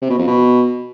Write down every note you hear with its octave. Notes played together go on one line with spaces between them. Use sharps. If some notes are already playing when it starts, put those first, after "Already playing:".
C3
B2
F2
B2